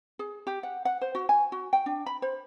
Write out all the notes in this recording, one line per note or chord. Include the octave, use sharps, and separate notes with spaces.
G#4
G4
F#5
F#5
C5
F#4
G#5
F#4
G5
D4
B5
C5